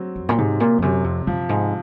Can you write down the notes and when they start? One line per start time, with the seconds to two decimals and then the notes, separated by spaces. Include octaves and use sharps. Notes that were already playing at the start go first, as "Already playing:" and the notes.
Already playing: F#3 C4
0.16 F2
0.29 A#2
0.38 G#2 C3
0.60 A#2
0.78 F2
0.82 F#2 C3
1.04 F2
1.27 F#2 F3
1.49 G#2